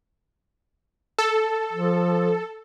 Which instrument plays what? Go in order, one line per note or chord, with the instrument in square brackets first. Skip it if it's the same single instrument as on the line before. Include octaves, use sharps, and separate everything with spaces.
[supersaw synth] A4
[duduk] F3